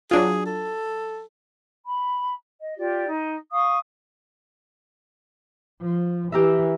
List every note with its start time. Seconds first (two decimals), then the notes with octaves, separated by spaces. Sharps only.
0.11 F#3 D4 F4 G#4
0.46 A4
1.85 B5
2.60 D#5
2.77 F4 G4 D5
3.08 D#4
3.52 F5 C#6 D#6
5.81 F3
6.32 E3 G4 A#4 E5